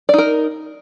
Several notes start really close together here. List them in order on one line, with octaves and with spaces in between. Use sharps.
D5 D#4 A#4